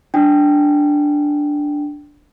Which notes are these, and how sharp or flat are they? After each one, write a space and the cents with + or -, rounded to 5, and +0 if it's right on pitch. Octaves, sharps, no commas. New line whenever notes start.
D4 +0 G5 -10